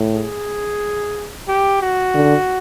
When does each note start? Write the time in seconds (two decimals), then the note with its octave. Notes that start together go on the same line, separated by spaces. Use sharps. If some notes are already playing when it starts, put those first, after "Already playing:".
Already playing: A2
0.13 G#4
1.48 G4
1.82 F#4
2.15 D3